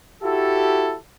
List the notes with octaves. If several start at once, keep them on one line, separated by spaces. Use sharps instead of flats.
E4 F#4 G4 A4